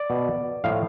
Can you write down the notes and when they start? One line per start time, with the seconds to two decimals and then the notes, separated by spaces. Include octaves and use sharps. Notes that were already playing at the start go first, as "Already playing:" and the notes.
Already playing: D5
0.10 B2
0.64 A2 F3 F5